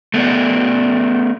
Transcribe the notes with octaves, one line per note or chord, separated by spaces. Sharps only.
A3 B3 A#4 D5